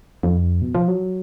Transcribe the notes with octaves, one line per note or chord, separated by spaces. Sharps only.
F2
B2
F3
F#3